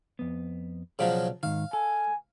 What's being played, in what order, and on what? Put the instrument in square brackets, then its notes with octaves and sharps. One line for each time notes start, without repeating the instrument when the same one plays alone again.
[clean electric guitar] F2 B3
[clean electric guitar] B1 D5 F5 [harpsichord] C#3 F3 F#3
[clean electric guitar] G#2 D#3 [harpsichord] F5
[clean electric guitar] A4 [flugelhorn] G#5